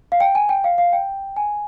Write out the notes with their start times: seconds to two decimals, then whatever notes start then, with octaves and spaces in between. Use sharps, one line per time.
0.12 F5
0.20 G5
0.35 G#5
0.49 G5
0.64 F5
0.78 F5
0.93 G5
1.36 G#5